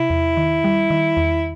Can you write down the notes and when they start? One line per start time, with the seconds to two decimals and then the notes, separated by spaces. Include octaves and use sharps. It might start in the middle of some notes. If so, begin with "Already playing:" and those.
Already playing: C3 E4
0.10 E2
0.37 D#3
0.64 G3
0.90 D#3
1.17 E2